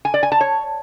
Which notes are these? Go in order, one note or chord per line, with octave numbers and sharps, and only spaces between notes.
G#5
D5
G#5
A5
C#5